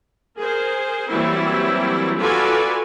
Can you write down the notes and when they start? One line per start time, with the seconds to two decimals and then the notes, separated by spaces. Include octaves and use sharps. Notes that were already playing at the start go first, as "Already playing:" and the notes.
0.40 G#4 A#4 C5
1.10 E3 F#3 G3 A#3 C4 E4
2.19 F4 F#4 A4 B4 D5 G#5